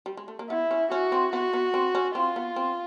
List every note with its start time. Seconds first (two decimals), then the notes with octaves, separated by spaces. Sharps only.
0.06 G3
0.17 G#3
0.28 A3
0.39 A#3
0.50 B3 E4
0.71 C#4
0.91 C#4 F#4
1.12 C4
1.33 B3 F#4
1.53 B3
1.74 C4
1.95 C#4
2.15 C4 F4
2.36 B3
2.56 C4